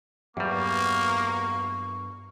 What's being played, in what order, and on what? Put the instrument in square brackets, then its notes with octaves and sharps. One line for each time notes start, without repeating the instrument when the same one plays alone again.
[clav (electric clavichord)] E2 G3 [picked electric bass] G2 F#3 B3 [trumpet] A#3 [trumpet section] C#6